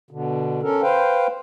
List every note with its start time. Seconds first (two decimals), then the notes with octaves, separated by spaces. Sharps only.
0.11 B2 D3
0.63 C#4 A4 A#4
0.82 B4 C5 F5 G5